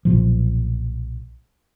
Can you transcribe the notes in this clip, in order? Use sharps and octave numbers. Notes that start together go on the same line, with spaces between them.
B1 A#2 F3